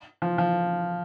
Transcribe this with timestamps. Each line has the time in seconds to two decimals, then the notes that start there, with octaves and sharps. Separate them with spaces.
0.22 F3
0.38 F3